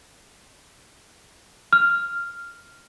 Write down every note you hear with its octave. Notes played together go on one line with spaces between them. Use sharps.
F6